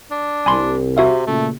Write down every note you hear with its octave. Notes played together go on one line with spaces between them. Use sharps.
D4
C2 G#5 B5 C6
C3 F#4 E5 F5
A#2 C#3 A3